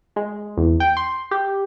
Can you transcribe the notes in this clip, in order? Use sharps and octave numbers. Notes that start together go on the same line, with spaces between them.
G#3
E2
G5
C6
G4